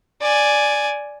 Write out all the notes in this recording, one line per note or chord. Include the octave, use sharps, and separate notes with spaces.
D5 G#5